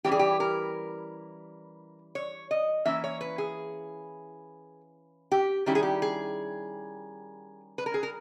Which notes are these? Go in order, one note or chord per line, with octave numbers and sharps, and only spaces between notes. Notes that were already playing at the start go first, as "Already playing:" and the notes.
E3 G3 C#4 E4 G4
G#4
G4
A#4
C#5
D#5
E3 A#3 C#4 E4 E5
C#5
B4
G#4
G4
D#3 G3 C#4 E4 G4
G#4
G4
G#4
B4
A#4
G#4
A#4